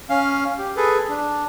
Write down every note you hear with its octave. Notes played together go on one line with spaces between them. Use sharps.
C#4 F5
G4
G#4 A4 B4
D4